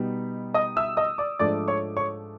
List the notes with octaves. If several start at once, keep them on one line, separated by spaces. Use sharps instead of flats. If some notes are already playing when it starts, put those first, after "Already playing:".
Already playing: B2 G3 B3 D#4
D#5 D#6
E5 E6
D#5 D#6
D5 D6
G#2 F3 A3 D4 D5 D6
C#5 C#6
C#5 C#6